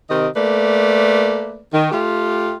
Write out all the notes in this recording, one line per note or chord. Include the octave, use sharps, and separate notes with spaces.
C3 D#3 D#5
A3 A#3 B4 D5
D#3
A3 F4 G4